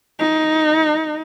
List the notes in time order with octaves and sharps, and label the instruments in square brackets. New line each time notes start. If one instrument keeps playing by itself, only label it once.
[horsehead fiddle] D#4